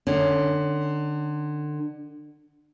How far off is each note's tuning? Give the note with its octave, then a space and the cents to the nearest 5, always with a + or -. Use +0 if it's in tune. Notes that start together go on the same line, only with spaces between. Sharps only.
D3 +30 C#4 +15